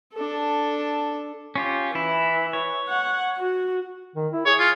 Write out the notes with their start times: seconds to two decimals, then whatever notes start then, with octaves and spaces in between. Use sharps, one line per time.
0.13 D4 A4
1.56 C#4 F4 G4
1.95 E3 E4
2.53 C#5
2.89 F#5
3.38 F#4
4.16 D#3
4.32 E4
4.46 G#4 C#5
4.60 F4